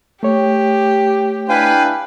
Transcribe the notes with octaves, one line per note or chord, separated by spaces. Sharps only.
A3 G4 C#5
D4 E4 B4 F5 G5 G#5